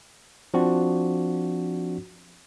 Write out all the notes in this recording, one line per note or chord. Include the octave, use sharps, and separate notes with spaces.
F3 C4 D4 F#4